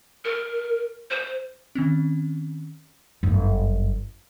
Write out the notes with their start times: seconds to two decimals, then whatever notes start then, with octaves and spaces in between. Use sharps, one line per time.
0.25 A#4
1.10 C5
1.75 D#3 C4 C#4
3.23 G1 F#2